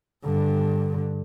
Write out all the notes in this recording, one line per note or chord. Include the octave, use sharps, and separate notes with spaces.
G2 D3